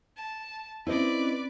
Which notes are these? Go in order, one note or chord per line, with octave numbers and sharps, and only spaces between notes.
A5
C4 C#4 E4 B4 C5 D5 D#5